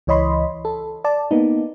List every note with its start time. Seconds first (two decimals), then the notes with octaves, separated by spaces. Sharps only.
0.07 C#2 E3 C#5 D#5 B5 C6
0.65 A4
1.04 D5 A5
1.31 A#3 B3 D#4